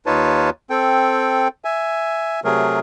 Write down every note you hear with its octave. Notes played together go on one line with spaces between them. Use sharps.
D#2 D#4 F4 B4 C#5 A5
C4 A4 G5
E5 G#5
C3 F#3 A3 G#4 A#4